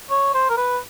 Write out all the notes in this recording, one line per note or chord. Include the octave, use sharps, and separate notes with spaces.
C#5
C5
A#4
B4